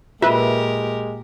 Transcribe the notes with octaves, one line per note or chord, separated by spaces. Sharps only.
A#2 G#3 F4 G4 A#4 B4 E5